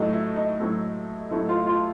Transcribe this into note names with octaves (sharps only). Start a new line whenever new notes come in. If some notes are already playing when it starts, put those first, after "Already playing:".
Already playing: A2 F#3 A3 D#4
E4
D#4
A2 F#3 A3
A2 F#3 A3 E4
F4
F4